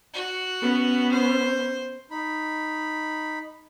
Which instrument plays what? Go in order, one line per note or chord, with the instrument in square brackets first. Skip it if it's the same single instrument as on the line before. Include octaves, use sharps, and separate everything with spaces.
[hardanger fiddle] F#4
[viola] B3 C#4
[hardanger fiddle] C5
[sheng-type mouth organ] D#4 B5